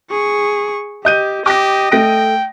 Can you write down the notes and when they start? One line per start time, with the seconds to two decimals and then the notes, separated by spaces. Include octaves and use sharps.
0.11 G#4 C#6
1.05 G4 D#5 G6 D#7
1.46 G4 D#5 D6 A#6
1.92 A3 G5 A#6 D7